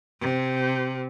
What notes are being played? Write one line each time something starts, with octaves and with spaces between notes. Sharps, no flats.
C3